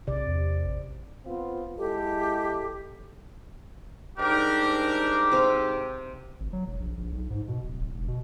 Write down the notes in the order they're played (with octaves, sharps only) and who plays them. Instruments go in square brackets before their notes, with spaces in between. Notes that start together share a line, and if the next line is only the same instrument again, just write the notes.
[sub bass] B1 [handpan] C3 D5
[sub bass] E2
A1
[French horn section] B3 C4 F4
[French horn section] G#3 E4 A4 [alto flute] G4
[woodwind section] G#2 D#4 G4 [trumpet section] G3 D4 A#4
[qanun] C3 C5 F5
[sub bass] G#1
F#3
E1
A#1
A#1
B1
G#2
B2
D1
D1
E1
B2